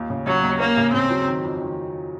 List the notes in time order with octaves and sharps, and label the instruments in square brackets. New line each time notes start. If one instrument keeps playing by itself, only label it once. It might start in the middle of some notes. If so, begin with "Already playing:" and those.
Already playing: [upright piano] D#2 F4
C#3
[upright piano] C#3 [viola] F#3
[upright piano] D#2
[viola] A#3 [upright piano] C#4
[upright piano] C#3
[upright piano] C#3 [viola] C4
[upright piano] F#3
D#3
F2
D#3